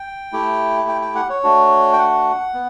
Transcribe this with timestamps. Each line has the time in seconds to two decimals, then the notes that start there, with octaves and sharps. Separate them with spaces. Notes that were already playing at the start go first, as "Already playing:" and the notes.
Already playing: G5
0.33 A3 E4 G4
0.89 G5
1.02 G5
1.15 F#5
1.30 C#5
1.44 A3 D4 F#4
1.93 G5
1.99 F#5
2.54 B3